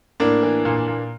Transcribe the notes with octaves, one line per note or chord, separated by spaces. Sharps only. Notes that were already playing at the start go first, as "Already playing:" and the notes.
A2 A#3 D4
E3
A#2
A#2